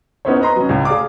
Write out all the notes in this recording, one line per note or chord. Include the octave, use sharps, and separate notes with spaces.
B3 C#4 D#4 E4 C5 C#5
B4 D#5 A#5 C6
F#3 C#4
C#2 A2
G#4 D5 F5 D6